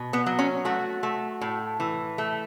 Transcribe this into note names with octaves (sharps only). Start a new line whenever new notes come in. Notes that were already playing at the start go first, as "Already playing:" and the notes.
Already playing: B2
B3
F#3
C#4
A3 F#4
A3
A2
E3
A3